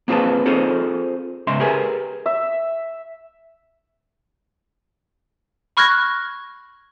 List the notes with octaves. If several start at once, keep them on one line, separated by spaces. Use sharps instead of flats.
A#3 C4 F4 G#4 B4 A5
C4 D#4 F4 G#4 A4 C5
G#2 C#3 E5 C6
G4 G#4 A#4 B4 G#5
E5
B5 C#6 F6 F#6 G#6 A#6